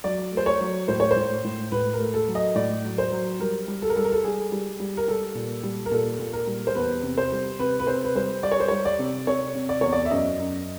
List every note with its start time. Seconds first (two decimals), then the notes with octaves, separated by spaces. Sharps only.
0.04 F#3 D5
0.32 A3
0.37 C5
0.46 C#5
0.61 F#3
0.88 A2 C5
1.00 C#5
1.11 C5
1.16 A2
1.44 A2
1.72 A2 B4
1.93 A#4
2.00 A3
2.14 A4
2.28 F#3
2.35 D#5
2.55 A2 D5
2.84 F#3
2.98 C5
3.12 F#3
3.40 G3 A#4
3.68 G3
3.82 A4
3.90 A#4
3.96 G3 A4
4.04 A#4
4.12 A4
4.24 G3 G#4
4.52 G3
4.80 G3
4.97 A#4
5.08 G3 A4
5.35 A#2
5.63 G3
5.86 A#4
5.91 A#2 A4
6.20 A#2
6.33 A#4
6.47 G3
6.67 C5
6.75 E2 B4
7.03 C3
7.18 C5
7.32 G3
7.59 C3 B4
7.80 B4
7.87 C3 C5
8.04 B4
8.15 G3 C5
8.43 G3 D5
8.52 C#5
8.60 C5
8.68 G3 C#5
8.85 D5
8.99 C3
9.27 C3 C#5
9.55 C3
9.69 D5
9.81 E2 C#5
9.93 D5
10.05 E5
10.11 F#2 D#5
10.39 F#2